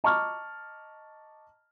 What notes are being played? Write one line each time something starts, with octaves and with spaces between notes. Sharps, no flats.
D#5 A5 A#5 C#6 D6 F6